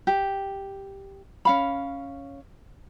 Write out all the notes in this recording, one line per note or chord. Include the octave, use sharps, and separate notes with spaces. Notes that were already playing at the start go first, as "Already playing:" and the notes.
G4
C#4 F5 B5